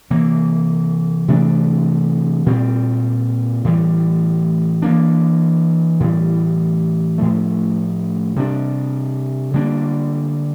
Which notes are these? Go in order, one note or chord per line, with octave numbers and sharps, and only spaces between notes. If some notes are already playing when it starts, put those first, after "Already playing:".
C3 E3 A#3
C3 E3 A3 D4
A#2 G3 C4
A2 E3 G3
E3 A#3 D4
A2 E3 G3
A2 F3 A3
C3 G3 D4
D3 G3 A#3 D4